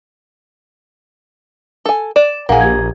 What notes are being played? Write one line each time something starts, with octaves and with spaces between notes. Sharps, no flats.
A4 G#5
D5 E7
A#1 A#3 G#4 F5 F#5
G4 G#6